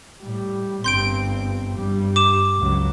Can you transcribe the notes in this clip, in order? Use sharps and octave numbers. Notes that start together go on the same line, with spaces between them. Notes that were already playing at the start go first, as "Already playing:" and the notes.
A2 G3
G1 C4 C6 G6 D7
G2 G3
D6 E7
C#2 F#3